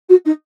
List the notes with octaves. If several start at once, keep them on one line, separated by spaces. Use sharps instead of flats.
F#4
D#4